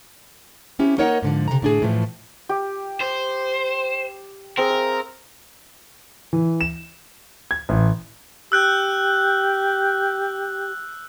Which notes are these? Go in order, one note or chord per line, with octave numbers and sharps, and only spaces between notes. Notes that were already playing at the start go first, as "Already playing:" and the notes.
C4 C#4 E4 G4
A#3 D#4 A#4 C#5 D#5 F#5
G#2 D3 F3
C3 A#5
A2 D4 G#4
A2 E3 F3 A3
G4
C5
C4 G#4 A#4
E5 F5
E3
E7
G#6
A1
G4 E6 F#6 G6